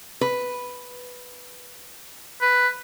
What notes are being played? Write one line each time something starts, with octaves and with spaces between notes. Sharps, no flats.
B4
B4